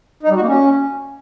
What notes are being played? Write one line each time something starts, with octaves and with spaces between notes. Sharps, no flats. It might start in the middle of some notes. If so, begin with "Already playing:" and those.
D#4
G3
F#4
A#3
C#4